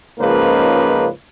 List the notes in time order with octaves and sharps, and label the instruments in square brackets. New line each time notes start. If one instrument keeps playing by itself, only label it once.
[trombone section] C#2 G#2 C#3 F3 A#3 B4